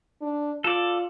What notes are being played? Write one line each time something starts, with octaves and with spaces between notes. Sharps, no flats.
D4
F4 A4 D5